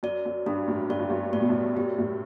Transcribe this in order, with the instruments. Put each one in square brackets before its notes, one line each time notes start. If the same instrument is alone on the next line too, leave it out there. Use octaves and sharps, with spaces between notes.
[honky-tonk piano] F#2 [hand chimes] D5
[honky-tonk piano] F#2
[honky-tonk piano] G2 [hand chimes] D4
[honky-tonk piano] F#2 A2
[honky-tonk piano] G2 [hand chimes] D5
[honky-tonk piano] F#2
G2
[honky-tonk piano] A2 [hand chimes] D5
[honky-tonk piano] B2
F#2 A2
[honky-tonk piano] F#2 [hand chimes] G4
[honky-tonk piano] F#2 A2